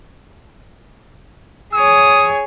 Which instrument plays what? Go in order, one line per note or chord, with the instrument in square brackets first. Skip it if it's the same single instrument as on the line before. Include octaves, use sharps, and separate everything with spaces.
[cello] G#4 C#5 [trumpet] D#6